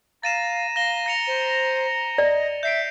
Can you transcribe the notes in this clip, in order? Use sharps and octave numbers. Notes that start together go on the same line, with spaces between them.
F5 A#5 A6 D#7 E7
F5 A#6 G7
A#6 C#7 F7
C5
D5 D#5
E5 G6 C7 D7